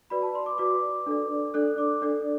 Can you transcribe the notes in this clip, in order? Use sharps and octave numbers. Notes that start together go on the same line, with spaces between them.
F#4 B4 D5 B5
A5
C6
D6
F#4 B4 D5 D6
D4 A4 D5
D4 A4 D5 F#6
D6
D4 A4 D5